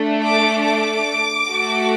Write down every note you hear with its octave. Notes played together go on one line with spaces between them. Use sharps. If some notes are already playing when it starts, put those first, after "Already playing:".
Already playing: A3 D4 A4
D6
D6
A3 F#4 A4